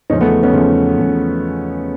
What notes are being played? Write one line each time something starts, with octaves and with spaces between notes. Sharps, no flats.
E2 C#3 F3 C#4 D#4
A3 B3
B3 C#4
E2 C#3 F3 A3
E2 C#3 F3